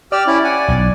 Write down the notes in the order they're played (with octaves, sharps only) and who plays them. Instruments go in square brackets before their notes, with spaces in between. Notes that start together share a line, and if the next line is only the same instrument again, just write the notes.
[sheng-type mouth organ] G4 E6 F6 [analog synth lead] D5
[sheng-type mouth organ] C#4 E4
F#5 G#5
[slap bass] B1